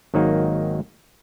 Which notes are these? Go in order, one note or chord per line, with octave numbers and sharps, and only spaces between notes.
G#1 D#3 F#3 A#3 D#4